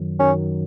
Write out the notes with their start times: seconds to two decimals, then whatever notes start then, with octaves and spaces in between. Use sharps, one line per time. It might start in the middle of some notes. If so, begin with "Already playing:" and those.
Already playing: F#2 D#3 F#3
0.20 F#2 D#3 F#3 C#4